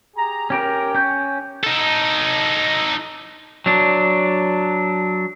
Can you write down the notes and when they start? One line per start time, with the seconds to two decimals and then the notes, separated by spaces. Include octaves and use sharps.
0.16 G4 G#4 A#5
0.50 C#4 G4 A#4 G5
0.95 C#4 G6
1.64 D#4 A4
3.66 F#3 D4